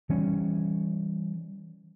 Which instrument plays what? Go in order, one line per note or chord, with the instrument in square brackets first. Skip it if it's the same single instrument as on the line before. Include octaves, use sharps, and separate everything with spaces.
[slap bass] E3 G3 C#4